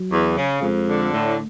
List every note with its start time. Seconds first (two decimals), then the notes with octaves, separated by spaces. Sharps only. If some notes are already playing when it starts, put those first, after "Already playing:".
Already playing: F#3
0.11 E2
0.36 C#3
0.61 F2 G#3
0.88 D3
1.13 A2 A3